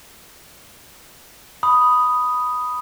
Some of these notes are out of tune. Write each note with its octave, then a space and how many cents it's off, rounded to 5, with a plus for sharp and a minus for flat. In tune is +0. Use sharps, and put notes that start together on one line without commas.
B5 +0 D#6 +0